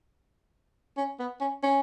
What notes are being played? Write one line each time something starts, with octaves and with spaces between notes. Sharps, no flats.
C#4
B3
C#4
C#4